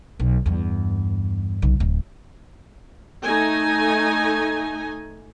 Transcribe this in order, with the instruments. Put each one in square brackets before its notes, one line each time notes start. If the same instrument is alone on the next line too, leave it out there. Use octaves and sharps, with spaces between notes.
[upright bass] B1
E2 G2
B1 C#3
D1
[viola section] A3 D#4 G#5